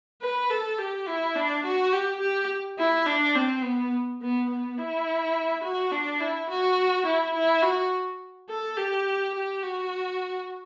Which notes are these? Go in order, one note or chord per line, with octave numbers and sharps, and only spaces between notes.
B4
A4
G4
E4
D4
F#4
G4
G4
E4
D4
C4
B3
B3
B3
E4
F#4
D4
E4
F#4
E4
E4
F#4
A4
G4
G4
F#4